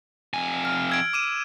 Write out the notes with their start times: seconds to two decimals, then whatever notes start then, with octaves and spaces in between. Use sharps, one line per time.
0.33 F2 G#5
0.65 F6
0.90 E6 G#6 D7
1.13 D6 D#7 E7